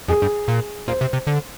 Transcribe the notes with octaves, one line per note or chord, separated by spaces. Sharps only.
F2 G#4
G2
A#2
A#2 C5
C3
C3
D3